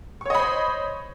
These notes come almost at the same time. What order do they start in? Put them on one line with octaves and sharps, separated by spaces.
C#6 C#5 D#5 B5 C5